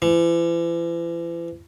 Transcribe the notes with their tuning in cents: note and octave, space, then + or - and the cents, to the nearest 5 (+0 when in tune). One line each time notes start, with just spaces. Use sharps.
E3 +40